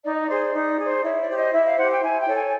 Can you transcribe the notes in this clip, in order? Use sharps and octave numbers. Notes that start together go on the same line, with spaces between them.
D#4 D5
D#5
G#4 C5 D5
D#4
G#4 C5
E4 C#5
D5
G4 C5
D#5
E4 E5
F5
G4 C5 F#5
G5
E4 G#5
G5
A4 C#5
G#5